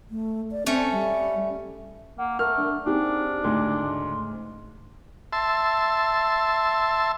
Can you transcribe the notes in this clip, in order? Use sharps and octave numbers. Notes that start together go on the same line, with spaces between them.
A3
D5
A3 C4 C#4
G3
A#3 F#5
A3 A#4 F6
D4
C4 D4 D#4 G4 G#4
D2 G#2 C#3 D#4 C6
E5 A5 C6